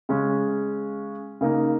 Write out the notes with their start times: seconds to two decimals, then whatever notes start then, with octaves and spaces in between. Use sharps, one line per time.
0.09 C#3 G#3 C#4
1.41 C#3 A#3 D#4